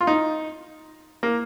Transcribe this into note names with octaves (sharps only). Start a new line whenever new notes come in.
F4
D#4
A#3